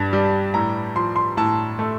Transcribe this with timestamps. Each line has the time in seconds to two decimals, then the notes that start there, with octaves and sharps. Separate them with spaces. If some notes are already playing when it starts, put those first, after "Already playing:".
Already playing: G2
0.13 G3
0.54 A2 A#5
0.96 F3 C6
1.16 C6
1.37 A2 A5
1.79 A3